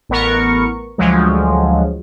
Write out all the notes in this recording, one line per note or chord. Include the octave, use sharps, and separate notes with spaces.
A1 B3 A#4 C#6
D2 F3 F#3 G#3